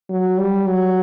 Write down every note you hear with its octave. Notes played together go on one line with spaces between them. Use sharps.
F#3
G3
F#3